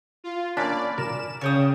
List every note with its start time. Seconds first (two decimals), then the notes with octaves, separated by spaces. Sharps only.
0.24 F4
0.57 A#3 C#4 D4 D5 B5
0.98 A#4 E7
1.41 C#3 C#5 G5 D#6